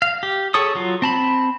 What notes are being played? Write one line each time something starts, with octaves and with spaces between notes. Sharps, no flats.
F5
G4
G#4 A4 C#5 D#6
F#3 F4
C4 A5 B5